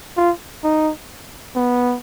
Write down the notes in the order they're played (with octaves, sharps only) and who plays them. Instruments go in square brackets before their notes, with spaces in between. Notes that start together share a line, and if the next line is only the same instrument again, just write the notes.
[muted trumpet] F4
D#4
B3